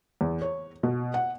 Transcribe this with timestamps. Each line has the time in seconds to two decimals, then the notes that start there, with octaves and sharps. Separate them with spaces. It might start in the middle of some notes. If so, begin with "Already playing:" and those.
0.21 E2
0.42 C#5
0.83 B2
1.14 F#5